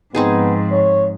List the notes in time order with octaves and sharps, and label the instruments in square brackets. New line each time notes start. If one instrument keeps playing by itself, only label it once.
[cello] G#2 F3 [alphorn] B3 [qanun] C4 D#4 G#4
[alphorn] C#5